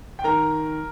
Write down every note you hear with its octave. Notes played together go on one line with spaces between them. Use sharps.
G5
D#3 A#4 A#5